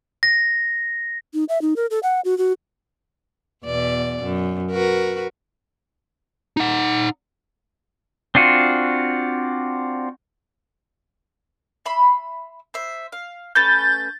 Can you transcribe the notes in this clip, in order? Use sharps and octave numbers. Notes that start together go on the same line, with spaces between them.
A#6
D#4
E5
D#4
A#4
A4
F#5
F#4
F#4
E2 B2 D5
F#2
F#4 A#4 B4
D#4 F#5
C4 D4 F4 F#4
E5 B5 C6
C5 E5
F5
A3 C#4 B4 G6 A6